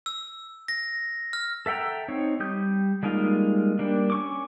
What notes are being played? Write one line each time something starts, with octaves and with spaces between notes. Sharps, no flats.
E6
A#6
F6
A4 E5 F#5 G5 A#5
C4 D#4 C#5
G3 G4 D#6 G6
G3 G#3 A#3 D#4 F4
G3 A#3 D4
C#4 C#6 D6